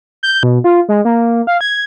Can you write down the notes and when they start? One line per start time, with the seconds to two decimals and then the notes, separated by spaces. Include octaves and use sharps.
0.23 G6
0.43 B2
0.64 F4
0.89 G#3
1.05 A#3
1.47 F5
1.61 G#6